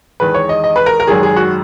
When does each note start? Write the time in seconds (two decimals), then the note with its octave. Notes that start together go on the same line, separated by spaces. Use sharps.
0.20 E2 D#3 G#3 B4
0.35 C#5
0.49 D#5
0.64 D#5
0.76 B4
0.86 A#4
1.00 A#4
1.07 G#1 F#2 D#3 G#3 G#4
1.23 G#4
1.36 F#4